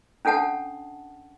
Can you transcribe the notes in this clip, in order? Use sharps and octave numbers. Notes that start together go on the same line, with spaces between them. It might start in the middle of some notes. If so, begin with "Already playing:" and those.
C#4 D4 A4 F#5 A5